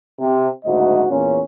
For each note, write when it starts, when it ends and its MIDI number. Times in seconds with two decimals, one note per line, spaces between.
0.19 0.47 48
0.65 1.04 30
0.65 1.04 38
0.65 1.04 44
0.65 1.04 66
0.65 1.04 75
1.10 1.40 40
1.10 1.40 46
1.10 1.40 61